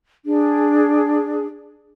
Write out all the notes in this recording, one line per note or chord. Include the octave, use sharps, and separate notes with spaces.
D4 G#4